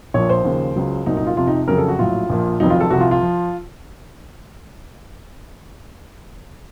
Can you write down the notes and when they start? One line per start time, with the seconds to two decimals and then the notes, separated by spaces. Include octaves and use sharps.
0.14 A#1 A#2 F3 C#5
0.29 C5
0.45 D#2 C#3 F3
0.76 C#2 C#3 F#3
1.06 C2 A#2 F#3 D#4
1.17 D#4
1.27 F4
1.37 F2 C3 F3 F4
1.47 D#4
1.68 F2 C#3 F#3 A#4
1.78 A4
1.88 F#4
1.99 A#1 A2 F#3 F4
2.29 A#1 A#2 F3
2.60 F1 F2 D#3 F#3 D#4
2.70 F4
2.80 A4
2.90 C2 C3 F3 F#4
3.01 F4
3.11 F4
3.22 F3